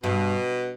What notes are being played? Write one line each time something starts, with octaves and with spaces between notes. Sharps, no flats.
G2 B2